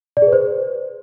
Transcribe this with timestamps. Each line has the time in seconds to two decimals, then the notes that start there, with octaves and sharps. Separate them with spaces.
0.17 D5
0.22 G#4
0.27 B4
0.33 C5